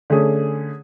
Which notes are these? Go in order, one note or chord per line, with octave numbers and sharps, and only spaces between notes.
D3 A3 C#4 G#4